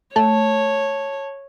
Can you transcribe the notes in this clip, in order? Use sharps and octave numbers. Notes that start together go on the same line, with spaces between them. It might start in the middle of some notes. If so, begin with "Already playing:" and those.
A3 C#5 A5